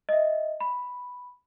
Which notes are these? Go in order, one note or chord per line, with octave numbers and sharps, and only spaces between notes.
D#5 E5
B5